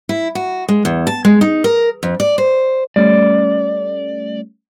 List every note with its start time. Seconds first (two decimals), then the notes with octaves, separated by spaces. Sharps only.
0.09 E4
0.35 F#4
0.69 G#3
0.85 E2
1.07 A5
1.25 G#3
1.41 D#4
1.64 A#4
2.03 F2
2.20 D5
2.38 C5
2.96 G3 A3 C#4 D5